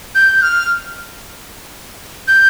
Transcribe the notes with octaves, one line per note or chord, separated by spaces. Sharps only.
G6
F6
G6